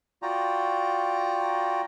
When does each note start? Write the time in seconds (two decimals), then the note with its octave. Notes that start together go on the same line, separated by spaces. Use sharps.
0.22 F4 F#4 D5 G5 A#5